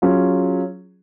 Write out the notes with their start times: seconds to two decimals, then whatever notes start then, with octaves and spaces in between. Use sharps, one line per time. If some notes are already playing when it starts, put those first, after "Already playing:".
0.02 F#3 C#4 F4 G#4